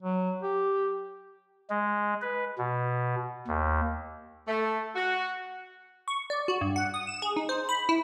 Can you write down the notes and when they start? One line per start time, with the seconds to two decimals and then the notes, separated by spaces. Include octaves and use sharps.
0.03 F#3
0.43 G4
1.70 G#3
2.22 B4
2.58 B2
3.48 D#2
4.48 A3
4.95 F#4
6.08 C#6
6.30 D5
6.48 F#4
6.61 G2
6.76 F#5
6.94 D#6
7.07 E7
7.22 G#4
7.36 D#4
7.49 C5
7.69 B5
7.89 E4